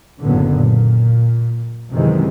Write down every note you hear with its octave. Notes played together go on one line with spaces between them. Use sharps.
F#1 F#2 A2 D3 B3
A#2
F#2 C3 D#3 E3 G#3